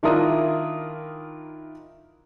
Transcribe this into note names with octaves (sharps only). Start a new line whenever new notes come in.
D#3 D4 E4 F4 A#4 D#6